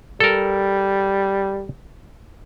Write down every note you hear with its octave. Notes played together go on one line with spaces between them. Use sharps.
G3 A4 A#4